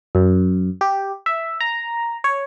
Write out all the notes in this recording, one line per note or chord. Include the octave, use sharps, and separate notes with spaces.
F#2
G4
E5
A#5
C#5